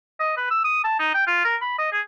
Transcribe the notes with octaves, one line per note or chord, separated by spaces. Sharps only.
D#5
B4
E6
D#6
A5
D#4
G5
F4
A#4
B5
D#5
G#4